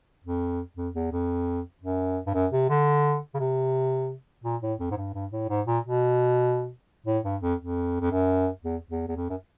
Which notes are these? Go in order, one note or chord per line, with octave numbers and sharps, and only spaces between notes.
F2
F2
E2
F2
F#2
G2
F#2
C3
D3
C#3
C3
A#2
A2
F2
G#2
G2
G2
A2
G#2
A#2
B2
A2
G2
F2
F2
F2
F#2
E2
E2
E2
F2
F#2